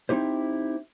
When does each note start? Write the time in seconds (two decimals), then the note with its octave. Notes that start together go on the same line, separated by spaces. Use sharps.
0.09 C4 D#4 E4 G4 C5